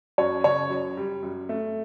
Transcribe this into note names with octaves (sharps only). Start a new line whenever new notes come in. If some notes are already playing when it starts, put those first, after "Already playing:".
F#2 C#5
C#3 C#5
F#2
G3
F#2
A3